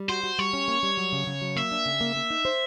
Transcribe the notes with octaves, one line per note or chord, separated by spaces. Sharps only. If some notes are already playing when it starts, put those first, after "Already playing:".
Already playing: G3
F#4 C5
F#4
G3 C#5
C#4
A#3
G3
F#3
C#3
C#3
F#3
A#3 E5
D4
C#3
A#3
A#3
D#4
C5